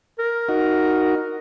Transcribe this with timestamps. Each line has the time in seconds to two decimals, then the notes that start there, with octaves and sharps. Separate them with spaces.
0.19 A#4
0.49 D#4 F#4